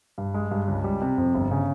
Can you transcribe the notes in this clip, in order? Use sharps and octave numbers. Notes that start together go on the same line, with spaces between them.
G2
G#3
G2
C#2
G3
C3
F2
G1
C#3